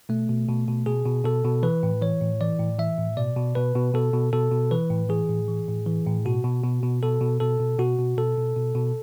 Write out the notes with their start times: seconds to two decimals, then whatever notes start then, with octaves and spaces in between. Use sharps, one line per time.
0.09 B2 A3
0.29 B2
0.48 B2
0.68 B2
0.86 B2 G#4
1.06 B2
1.24 B2 A4
1.45 B2
1.63 E3 B4
1.83 A2
2.02 E3 C#5
2.21 A2
2.41 E3 D5
2.59 A2
2.79 E3 E5
2.98 A2
3.17 B2 D5
3.37 B2
3.55 B2 B4
3.75 B2
3.94 B2 A4
4.13 B2
4.33 B2 A4
4.52 B2
4.71 E3 B4
4.90 A2
5.09 E3 G#4
5.29 A2
5.48 E3
5.68 A2
5.86 E3
6.07 A2
6.25 B2 F#4
6.44 B2
6.64 B2
6.83 B2
7.03 B2 A4
7.21 B2
7.40 B2 A4
7.59 B2
7.79 B2 F#4
7.98 B2
8.17 B2 A4
8.38 B2
8.56 B2
8.75 B2